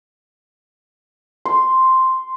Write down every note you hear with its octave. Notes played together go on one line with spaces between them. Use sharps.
C6